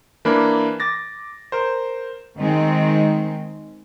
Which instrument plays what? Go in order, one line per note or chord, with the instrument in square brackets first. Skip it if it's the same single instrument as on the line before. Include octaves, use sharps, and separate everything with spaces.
[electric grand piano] E3 A#3 D4 A#4 B5
D6 A6 A#6
A#4 C5
[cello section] D#3 G#3 C4